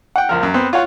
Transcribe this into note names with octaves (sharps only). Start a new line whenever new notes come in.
F#5 G5
C#2 F3 A#4
F#2
B3 C4
F4 C#5 F#5